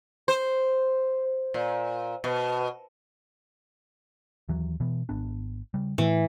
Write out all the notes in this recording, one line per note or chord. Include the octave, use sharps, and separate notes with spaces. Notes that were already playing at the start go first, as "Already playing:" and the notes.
C5
A#2
B2
D#2 E3 F#3
B2 E3 B3
G#1 B3 D4
C#3 G3
A2 E3 A3